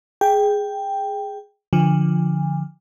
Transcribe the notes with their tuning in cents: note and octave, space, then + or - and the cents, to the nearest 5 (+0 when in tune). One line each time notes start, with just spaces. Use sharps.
G#4 +0 G5 +5
D3 +0 F3 +0 G#5 -35